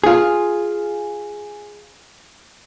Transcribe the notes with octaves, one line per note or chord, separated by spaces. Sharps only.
F4 G#4